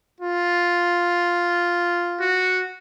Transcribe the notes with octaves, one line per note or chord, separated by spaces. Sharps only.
F4
F#4